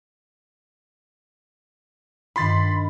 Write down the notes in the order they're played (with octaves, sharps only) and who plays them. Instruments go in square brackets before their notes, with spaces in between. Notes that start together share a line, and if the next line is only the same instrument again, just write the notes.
[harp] G2 D#3 F4 [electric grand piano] B5 C6 A6